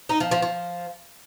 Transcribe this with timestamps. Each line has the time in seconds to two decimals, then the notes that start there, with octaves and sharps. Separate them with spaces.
0.09 D#4
0.20 F3
0.31 F3
0.42 F3